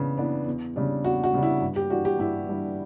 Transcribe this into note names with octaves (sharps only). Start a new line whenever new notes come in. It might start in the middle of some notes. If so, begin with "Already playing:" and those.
Already playing: C#3 E3 B3 D4
E3 B3 D4
E2
C#3 G3 D4
E2 F#4
F#4
C#3 G3 D4
E4
G2
G4
E3 G3 D4 F#4
G4
G2 E4
E3 G3 D4